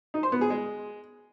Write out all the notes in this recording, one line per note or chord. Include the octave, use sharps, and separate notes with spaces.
D#4
C5
B3
G#4
G#3